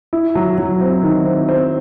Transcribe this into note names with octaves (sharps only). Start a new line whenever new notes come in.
E4
F#3
F#3
C4
D#3
C4
C4